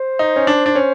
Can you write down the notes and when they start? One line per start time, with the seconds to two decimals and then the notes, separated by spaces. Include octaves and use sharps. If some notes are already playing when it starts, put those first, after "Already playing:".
Already playing: C5
0.19 D#4
0.36 C#4
0.47 D4
0.66 D4
0.75 C#4